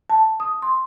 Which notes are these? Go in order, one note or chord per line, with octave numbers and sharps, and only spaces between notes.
A5
D#6
C6